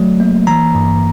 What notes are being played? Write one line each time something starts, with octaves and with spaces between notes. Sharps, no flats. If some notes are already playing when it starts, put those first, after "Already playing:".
Already playing: F#3 A3
A#3
E3 A#5
G2